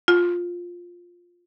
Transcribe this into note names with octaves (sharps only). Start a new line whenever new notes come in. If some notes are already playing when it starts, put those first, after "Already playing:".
F4